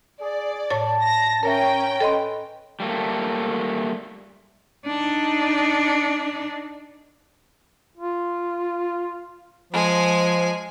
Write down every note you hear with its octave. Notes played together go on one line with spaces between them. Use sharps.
G#4 D5
A2 C#5 A5 A6
A#6
C#4 A#4 C#5 E5 G5 A#5
A4 B4 D#5 C6
G3 A3 A#3
D4 D#4
F4
F3 G#3 G#5